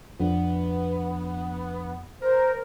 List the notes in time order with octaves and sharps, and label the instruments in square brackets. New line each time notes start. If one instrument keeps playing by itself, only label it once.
[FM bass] F2 [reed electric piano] F3 D4 [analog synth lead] B3
[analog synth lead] A#4 [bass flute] C5